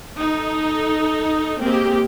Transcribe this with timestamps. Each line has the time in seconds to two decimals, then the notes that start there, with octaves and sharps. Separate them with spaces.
0.20 D#4 A4
1.61 G#3 A#3 C4 G4